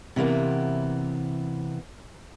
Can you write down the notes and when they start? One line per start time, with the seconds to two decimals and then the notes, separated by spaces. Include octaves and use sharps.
0.16 C3 E3 A#3 B3